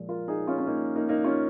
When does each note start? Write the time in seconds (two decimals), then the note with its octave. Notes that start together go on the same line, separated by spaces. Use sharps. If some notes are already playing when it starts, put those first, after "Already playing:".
Already playing: A#2 F3 G#3
0.09 F4 A#4
0.28 D#4 G#4
0.47 C#4 F4
0.58 C#4
0.67 A#3 D#4
0.96 A#3 D#4
1.09 A#3 D#4
1.24 C#4 F4